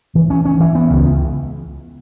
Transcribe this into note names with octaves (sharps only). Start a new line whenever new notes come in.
E3
C#4
C#4
E3
B3
C#2
C#2